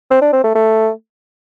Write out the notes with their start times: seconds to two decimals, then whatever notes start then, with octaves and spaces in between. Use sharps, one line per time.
0.10 C4
0.22 D4
0.33 C4
0.44 A3
0.55 A3